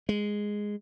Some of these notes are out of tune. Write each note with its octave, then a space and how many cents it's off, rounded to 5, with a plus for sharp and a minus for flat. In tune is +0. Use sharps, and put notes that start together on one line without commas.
G#3 -5